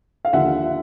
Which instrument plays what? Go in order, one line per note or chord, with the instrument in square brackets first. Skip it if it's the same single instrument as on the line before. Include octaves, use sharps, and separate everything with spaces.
[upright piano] F5
D#2 D3 F3 E5 F#5